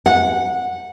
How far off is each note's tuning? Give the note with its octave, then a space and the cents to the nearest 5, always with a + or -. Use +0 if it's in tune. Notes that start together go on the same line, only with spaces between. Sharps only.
F#5 -15